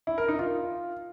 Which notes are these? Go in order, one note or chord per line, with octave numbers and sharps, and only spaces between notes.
E4
A#4
D#4
F4